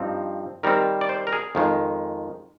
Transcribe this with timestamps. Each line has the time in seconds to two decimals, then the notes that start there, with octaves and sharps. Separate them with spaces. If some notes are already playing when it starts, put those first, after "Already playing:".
Already playing: G2 F3 C4 D#4
0.63 D#3 G3 C4 A#4
1.01 D5
1.09 C5
1.27 A#4
1.33 G#4
1.55 F2 D#3 G#3